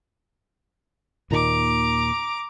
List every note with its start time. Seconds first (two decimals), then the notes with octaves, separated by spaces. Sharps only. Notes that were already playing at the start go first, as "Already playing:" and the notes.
1.31 D#2 A#2 D#3 A#5 D6